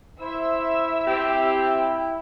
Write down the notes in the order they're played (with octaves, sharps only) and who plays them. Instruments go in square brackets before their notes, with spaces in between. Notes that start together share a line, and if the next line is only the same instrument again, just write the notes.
[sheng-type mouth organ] E4 [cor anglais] C5 [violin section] E5 E6
[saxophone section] C4 G4 [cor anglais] G5